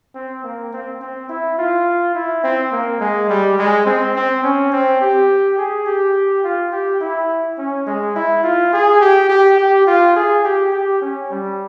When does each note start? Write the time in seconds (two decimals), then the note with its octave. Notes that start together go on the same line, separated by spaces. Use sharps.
0.15 C4
0.44 A#3
0.73 C4
1.01 C4
1.29 E4
1.58 F4
2.15 E4
2.44 C4
2.72 A#3
3.00 G#3
3.29 G3
3.59 G#3
3.86 C4
4.15 C4
4.43 C#4
4.72 C4
5.01 G4
5.58 G#4
5.86 G4
6.44 F4
6.72 G4
7.01 E4
7.58 C#4
7.87 G#3
8.16 E4
8.43 F4
8.73 G#4
9.01 G4
9.29 G4
9.58 G4
9.87 F4
10.16 G#4
10.45 G4
10.72 G4
11.02 C#4
11.30 G3